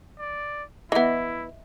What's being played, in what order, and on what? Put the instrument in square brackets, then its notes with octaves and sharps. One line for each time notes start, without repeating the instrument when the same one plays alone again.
[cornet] D5
[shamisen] E3 B3 [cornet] E4 [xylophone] D#5 E5